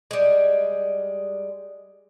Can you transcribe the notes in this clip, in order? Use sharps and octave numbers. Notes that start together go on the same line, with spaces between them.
G3 G#3